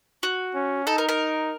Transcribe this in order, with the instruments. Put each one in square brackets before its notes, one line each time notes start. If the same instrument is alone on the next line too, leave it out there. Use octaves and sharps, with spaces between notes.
[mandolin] F#4
[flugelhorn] C#4
[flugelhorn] D#4 [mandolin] A4
[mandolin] A#4
A#4